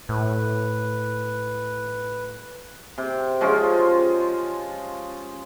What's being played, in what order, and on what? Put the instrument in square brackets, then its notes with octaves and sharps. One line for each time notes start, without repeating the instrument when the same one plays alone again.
[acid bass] A2 [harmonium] B4
[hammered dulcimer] C3
F3 G#3 C#4 F4